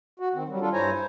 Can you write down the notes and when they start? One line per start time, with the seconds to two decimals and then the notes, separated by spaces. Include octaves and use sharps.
0.20 F#4
0.34 D#3 C4
0.49 F#3 G3
0.61 G3 D4 F4 A4
0.73 G2 E4 C5 C#5 G#5 A#5
0.92 C5